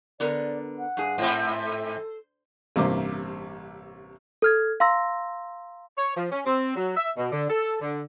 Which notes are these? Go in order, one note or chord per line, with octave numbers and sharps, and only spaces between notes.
D3 B3 A#4 D5
F#5
G2 G#4
G#2 C4 C5
A4
A1 G2 C3 A#3 C5 D6
A4 F6 G#6
F5 A#5 C6 E6 A#6
C#5
F3
C#4
C4
F#3
E5
B2
D3
A4
D3